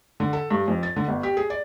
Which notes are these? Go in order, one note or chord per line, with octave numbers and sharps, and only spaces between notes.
D3
A4
G2
F2
A6
D3
G1
G4
G#4
D5